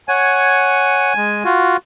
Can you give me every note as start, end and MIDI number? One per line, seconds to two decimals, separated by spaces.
0.09 1.13 73
0.09 1.13 78
0.09 1.56 80
1.17 1.43 56
1.45 1.77 65
1.45 1.77 66